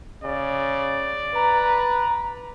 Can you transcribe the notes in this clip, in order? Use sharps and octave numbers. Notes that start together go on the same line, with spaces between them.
C#3 D5
B4 A#5